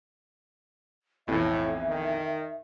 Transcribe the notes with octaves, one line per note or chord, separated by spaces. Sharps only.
B1 F2 A2 E3 E5
D#3